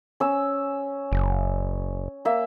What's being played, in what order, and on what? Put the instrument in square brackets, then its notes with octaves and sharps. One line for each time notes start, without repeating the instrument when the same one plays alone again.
[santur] C#4 E6
[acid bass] F#1
[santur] A#3 E5